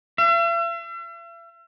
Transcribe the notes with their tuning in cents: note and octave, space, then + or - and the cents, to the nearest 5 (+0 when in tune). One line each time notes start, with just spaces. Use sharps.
E5 +45